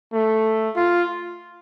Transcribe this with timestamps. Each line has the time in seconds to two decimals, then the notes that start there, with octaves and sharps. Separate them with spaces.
0.13 A3
0.76 F4